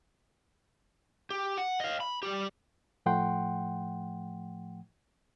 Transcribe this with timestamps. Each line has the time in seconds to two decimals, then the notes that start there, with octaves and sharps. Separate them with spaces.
1.30 G4
1.58 F#5
1.80 D#5 F5
2.00 B5
2.23 G3 G4
3.06 A2 F3 A3 F#5 G5 C6